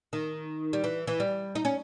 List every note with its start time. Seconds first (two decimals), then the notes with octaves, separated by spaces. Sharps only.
0.13 D#3
0.73 G3
0.84 E3
1.07 E3
1.20 G3
1.55 D#4
1.65 C#4